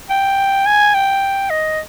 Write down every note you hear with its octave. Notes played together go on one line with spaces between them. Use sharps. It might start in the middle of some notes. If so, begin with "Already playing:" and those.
G5
G#5
G5
D#5